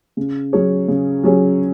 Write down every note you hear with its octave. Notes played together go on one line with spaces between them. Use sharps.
C#3
F#3 C#4 G#4 C#5
C#3
F#3 C#4 G#4 C#5